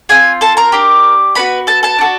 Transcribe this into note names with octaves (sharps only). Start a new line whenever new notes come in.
C4 F4 G#4 G#5
A4 A5
A#4 A#5
D4 G4
B3 D4 F#4 B4 B5
A4 A5
A4 A5
D4 F#4 A4